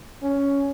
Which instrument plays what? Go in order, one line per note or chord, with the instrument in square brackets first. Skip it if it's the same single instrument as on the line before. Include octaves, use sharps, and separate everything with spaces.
[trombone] C#4